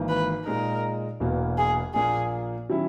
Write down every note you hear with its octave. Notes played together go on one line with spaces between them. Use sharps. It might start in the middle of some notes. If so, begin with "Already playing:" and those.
Already playing: G#1 G#2 E3 A#3
B4
A#2 G#3 D#4 A#4
E1 E2 B2 A#3
G#4
A#1 A#2 A#3 G#4
D#3 F#3 C#4 E4